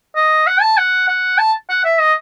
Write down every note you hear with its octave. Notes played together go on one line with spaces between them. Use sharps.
D#5
F#5
A5
F#5
F#5
A5
F#5
E5
D#5